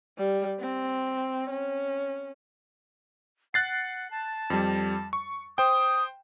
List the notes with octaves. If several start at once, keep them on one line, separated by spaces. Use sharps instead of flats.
G3
C4
C#4
F#5 F#6 A6 C7
A5
F2 G3
C#6
C5 G5 D#6